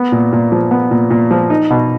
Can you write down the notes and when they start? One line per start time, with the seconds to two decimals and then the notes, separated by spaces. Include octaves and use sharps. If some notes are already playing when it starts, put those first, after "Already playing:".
Already playing: B3
0.12 A#2
0.33 A#2
0.52 F3
0.71 B3
0.91 A#2
1.10 A#2
1.31 F3
1.50 D#4
1.70 B2